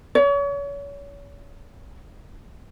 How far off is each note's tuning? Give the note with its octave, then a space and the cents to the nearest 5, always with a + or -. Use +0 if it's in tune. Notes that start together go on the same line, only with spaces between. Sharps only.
C#5 +35